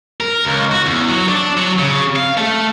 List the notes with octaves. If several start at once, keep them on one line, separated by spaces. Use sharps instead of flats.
A#4
C#2
F#4
E2
F#3
D4
F#3
C#3
F5
A3